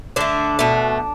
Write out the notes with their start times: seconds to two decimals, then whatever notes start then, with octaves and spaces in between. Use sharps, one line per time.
0.16 D3 A3 D4
0.59 B2 A3